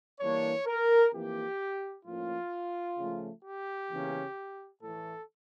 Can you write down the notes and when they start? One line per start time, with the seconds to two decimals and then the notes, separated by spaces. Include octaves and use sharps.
0.20 G2 E3 A#3 D4 C#5
0.67 A#4
1.13 F2 E3 A#3 G4
2.05 A2 F3 A#3 C#4 F4
2.98 C#3 F3 A3
3.44 G4
3.90 E2 C#3 E3 A#3 C#4
4.82 A2 E3 A3 A4